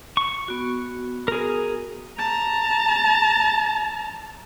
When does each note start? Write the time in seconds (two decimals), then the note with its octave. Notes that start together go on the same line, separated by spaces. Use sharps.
0.17 C#6
0.48 B3 F#4
1.28 G#4 A#4
2.19 A5 A#5